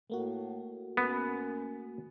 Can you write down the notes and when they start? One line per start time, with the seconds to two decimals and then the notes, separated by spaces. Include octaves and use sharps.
0.10 A2 A3 A#3 F#4
0.97 F#2 B3